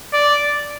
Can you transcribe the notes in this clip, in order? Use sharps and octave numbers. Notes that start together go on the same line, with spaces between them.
D5